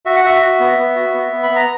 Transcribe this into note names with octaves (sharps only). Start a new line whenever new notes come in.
F#4 E5
F#5
F#4 E5
F#4
B3
B3
F#4
B3
B3
B5
B3
A#5